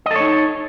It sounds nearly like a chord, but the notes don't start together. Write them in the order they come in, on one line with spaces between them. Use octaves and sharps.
D#5 A4 C#5 D#4